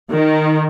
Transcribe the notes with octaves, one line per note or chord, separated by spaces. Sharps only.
D#3